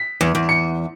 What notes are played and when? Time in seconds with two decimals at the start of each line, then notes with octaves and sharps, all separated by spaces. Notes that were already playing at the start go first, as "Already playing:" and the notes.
Already playing: B6
0.21 E2
0.35 E2
0.49 C#7